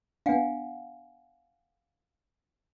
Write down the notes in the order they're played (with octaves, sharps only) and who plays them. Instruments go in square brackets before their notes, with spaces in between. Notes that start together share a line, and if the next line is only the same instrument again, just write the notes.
[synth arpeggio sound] B3 D4 [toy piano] F5 F#5 G#5